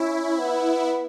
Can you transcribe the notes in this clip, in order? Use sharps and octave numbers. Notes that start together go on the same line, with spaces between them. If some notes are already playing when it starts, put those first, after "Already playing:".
Already playing: C#4 E4
B3